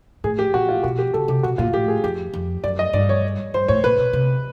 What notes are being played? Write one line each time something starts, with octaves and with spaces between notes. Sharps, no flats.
A2 G#4
G4
A#2 F#4
F4
B2 F#4
G4
C#3 A4
C3 G4
B2 F#4
A#2 F4
A2 G4
G#4
F2 G4
F2
F#2 D5
D#5
G2 D5
C#5
G2 C5
A2 C#5
A#2 B4
B2
C3